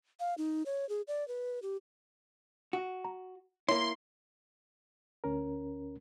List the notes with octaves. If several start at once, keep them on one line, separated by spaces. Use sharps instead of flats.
F5
D#4
C#5
G#4
D5
B4
G4
F#4
A#5
A#3 E4 C#5 C6
D2 C#4 A#4